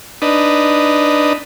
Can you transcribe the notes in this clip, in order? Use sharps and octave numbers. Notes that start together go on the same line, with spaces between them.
D4 D#4 B4